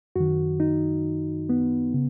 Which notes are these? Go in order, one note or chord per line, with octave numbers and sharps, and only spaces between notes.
F#2 D#3 F#4
D#4
B3
C#3